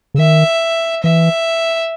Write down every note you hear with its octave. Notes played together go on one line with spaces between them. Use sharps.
C#3
D#3 E5
E3 E5